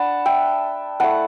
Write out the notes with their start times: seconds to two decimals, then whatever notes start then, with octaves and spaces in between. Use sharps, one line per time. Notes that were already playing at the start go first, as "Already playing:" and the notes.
Already playing: D4 F#5 A5 B5
0.26 E5 G5
1.00 A3 E4 F#5 A5